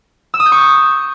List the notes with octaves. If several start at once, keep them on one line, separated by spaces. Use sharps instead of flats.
E6
D#6
G6
C#6